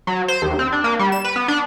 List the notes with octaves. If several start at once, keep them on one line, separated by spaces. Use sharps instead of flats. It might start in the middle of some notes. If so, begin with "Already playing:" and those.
F#3
C5
D#2
C4
D4
A#3
G3
E7
B4
B3
D4